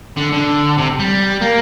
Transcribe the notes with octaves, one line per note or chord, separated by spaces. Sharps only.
D3
D3
C3
G3
A#3